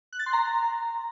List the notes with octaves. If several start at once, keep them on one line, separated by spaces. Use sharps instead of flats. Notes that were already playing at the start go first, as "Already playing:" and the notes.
F#6
A6
C6
A#5